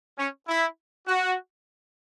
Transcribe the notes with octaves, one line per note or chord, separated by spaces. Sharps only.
C#4
E4
F#4